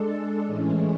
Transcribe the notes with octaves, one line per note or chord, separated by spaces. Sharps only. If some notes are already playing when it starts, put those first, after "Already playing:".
Already playing: G#3 D4 A4
A2 E3 G#3 C#4